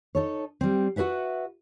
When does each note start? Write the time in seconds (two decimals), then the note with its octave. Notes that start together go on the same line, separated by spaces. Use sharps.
0.15 D#4 A4 C#5
0.61 G3 C4
0.96 F#4 G#4 B4 E5 F#5